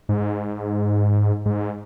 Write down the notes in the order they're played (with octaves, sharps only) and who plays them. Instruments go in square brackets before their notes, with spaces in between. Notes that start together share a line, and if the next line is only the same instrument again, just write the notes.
[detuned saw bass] G#2
G#2